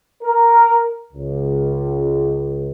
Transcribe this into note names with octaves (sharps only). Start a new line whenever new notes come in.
A#4
C#2